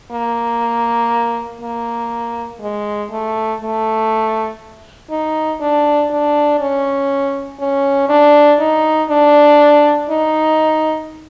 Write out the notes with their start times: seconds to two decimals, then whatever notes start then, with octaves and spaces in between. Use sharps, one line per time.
0.12 A#3
1.61 A#3
2.61 G#3
3.11 A3
3.61 A3
5.10 D#4
5.61 D4
6.11 D4
6.60 C#4
7.60 C#4
8.09 D4
8.60 D#4
9.10 D4
10.10 D#4